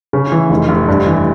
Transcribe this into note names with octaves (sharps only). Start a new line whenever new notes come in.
C#3
E3
F1
F1
G2
E3